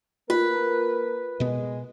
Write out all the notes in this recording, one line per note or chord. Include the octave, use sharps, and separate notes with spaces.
A#3 F4 A#4 B4
B2 G#3 B3 D#5